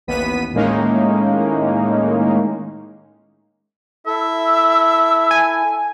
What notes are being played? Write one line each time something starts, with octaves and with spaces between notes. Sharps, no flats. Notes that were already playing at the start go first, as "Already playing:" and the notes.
A1 D#2 B3 B6 D#7
A2 D#3 G#3 A#3 C#4 D#4
E4 A4 E5
G#5